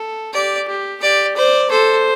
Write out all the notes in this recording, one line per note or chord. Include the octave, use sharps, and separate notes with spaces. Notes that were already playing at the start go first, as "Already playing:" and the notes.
Already playing: A4
G4 D5
G4
G4 D5
C5 D5
A4 C5